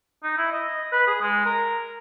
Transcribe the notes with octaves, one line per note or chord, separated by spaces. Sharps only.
D#4
E4
D#5
B4
G#4
G#3
A#4